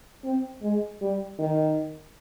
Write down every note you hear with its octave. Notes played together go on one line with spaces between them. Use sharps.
C4
G#3
G3
D#3